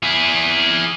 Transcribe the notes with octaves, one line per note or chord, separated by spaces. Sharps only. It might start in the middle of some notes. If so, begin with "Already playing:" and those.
E4 G#4